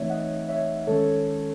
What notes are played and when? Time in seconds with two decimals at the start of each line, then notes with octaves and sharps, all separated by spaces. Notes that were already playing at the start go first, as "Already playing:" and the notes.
Already playing: E3 A3 C4 D#4 C#5 E5
0.10 D#5 F#5
0.49 C#5 E5
0.87 D#3 G#3 C#4 A4 C#5